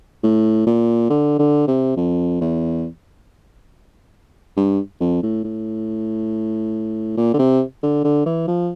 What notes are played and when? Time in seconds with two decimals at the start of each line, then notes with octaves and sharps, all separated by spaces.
0.23 A2
0.67 A#2
1.10 D3
1.39 D3
1.68 C3
1.97 F2
2.41 E2
4.57 G2
5.01 F2
5.23 A2
5.44 A2
7.17 A#2
7.34 D3
7.39 C3
7.83 D3
8.04 D3
8.26 E3
8.47 F3